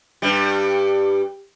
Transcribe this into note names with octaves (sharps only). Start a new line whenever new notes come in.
G2 G3